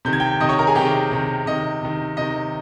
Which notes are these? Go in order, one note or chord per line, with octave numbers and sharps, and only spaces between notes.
C3 D#3 G6
G#6
G5 G6
C3 D#3 D#5 D#6
C#5 C#6
A#4 A#5
G#4 G#5
C3 D#3 G4 G5
C3 D#3
C3 D#3 D#5
C3 D#3
C3 D#3 D#5